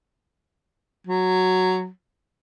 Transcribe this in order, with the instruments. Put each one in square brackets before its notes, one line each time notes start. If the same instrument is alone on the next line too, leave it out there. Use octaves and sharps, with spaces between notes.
[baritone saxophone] F#3